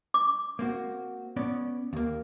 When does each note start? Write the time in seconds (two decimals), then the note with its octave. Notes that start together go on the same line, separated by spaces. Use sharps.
0.14 D6
0.59 A#3 C4 F#4
1.36 B3 C#4 D5
1.93 D#2 A#3